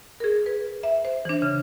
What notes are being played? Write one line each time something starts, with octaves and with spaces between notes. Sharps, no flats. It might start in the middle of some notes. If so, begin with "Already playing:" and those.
G#4 A#4
B4
E5
C5
E3 D4
C#3